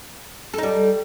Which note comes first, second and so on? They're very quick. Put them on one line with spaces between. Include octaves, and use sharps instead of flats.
A4 D#4 G3